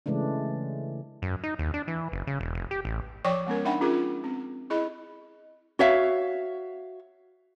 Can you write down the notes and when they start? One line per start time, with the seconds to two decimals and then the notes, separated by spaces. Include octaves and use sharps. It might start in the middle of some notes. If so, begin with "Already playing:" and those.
0.06 C#3 E3 G#3 A3 D4
1.22 F#2
1.44 D#4
1.59 D#2
1.74 D4
1.88 E3
2.12 F#1
2.27 C#3
2.40 E1
2.54 F1
2.71 G4
2.85 A1
3.25 F3 C#5 D5 G5 C#6 D6
3.47 G#3 B3 C#4 A#4
3.65 D4 D#4 E5 F#5 G5 B5
3.81 C#4 F4 G#4 A#4
4.24 C4
4.70 E4 G#4 D#5 B5
5.79 F#4 C#5 E5 F5